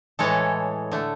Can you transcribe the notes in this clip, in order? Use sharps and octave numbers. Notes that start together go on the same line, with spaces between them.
A2 E3 G#3 A4 C#5
D3 A3